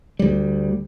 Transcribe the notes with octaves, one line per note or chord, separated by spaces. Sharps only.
D2 G3